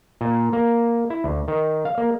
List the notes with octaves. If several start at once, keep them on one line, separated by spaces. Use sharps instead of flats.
A#2
A#3
E4
D2
D#3
F5
A#3